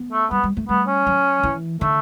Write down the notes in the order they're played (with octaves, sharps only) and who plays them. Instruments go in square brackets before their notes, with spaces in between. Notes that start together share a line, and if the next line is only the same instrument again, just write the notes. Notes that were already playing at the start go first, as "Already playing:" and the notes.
Already playing: [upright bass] B3
[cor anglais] A3
[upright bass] G3 [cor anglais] B3
[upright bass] G3
A3
[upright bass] G3 [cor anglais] B3
[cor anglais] C#4
[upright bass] F#3
E3
[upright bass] D3 [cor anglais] A3